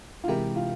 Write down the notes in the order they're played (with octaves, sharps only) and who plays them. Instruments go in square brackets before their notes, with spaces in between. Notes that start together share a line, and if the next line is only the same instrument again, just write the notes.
[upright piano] F4
[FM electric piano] C3 E3 G#3 E4 A#4 [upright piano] G4
[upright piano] F4